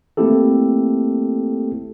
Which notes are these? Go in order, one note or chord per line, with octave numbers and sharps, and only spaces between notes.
A3 A#3 C4 E4 G4 A4